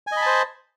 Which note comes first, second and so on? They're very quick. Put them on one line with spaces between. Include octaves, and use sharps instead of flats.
G#5 D#5 B5 A5 C5